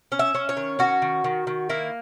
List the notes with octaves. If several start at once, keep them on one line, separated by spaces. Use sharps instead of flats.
C#4
E5
C#4
C#5
D#3
C#4 F#4
D#3
D#3
D#3
A#3 E4